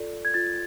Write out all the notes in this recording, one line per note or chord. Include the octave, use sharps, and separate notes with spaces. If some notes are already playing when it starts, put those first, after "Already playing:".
Already playing: F4 A4 D5
G#6
F4 A6